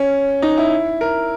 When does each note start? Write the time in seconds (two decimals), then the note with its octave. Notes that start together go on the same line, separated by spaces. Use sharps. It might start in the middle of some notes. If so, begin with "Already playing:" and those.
Already playing: C#4
0.42 D#4
0.58 E4
1.01 A#4